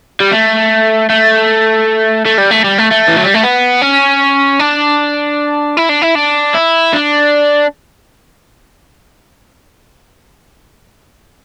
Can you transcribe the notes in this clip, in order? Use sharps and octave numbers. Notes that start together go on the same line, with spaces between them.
G3
A3
A3
A3
G3
A3
G3
A3
A3
E3
F#3
G3
A3
B3
C#4
D4
E4
D4
E4
D4
E4
D4